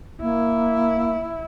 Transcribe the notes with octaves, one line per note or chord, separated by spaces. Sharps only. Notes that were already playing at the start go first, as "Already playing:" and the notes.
A#3 E4